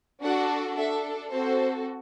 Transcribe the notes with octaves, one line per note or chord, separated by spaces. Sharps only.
D4 F#4 A4 F#5
D4 A4 E5
C4 F#4 A4 C5